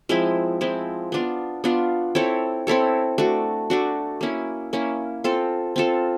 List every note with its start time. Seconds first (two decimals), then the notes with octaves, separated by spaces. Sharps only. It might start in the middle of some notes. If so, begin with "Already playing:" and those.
0.09 F3 G#3 C4 E4
0.61 F3 G#3 C4 E4
1.12 B3 D4 F4
1.64 B3 D4 F4
2.15 C4 E4 A4 C#5
2.67 C4 E4 A4 C#5
3.18 A3 D4 F#4
3.70 A3 D4 F#4
4.21 A#3 C#4 E4
4.73 A#3 C#4 E4
5.24 C4 F4 A4
5.76 C4 F4 A4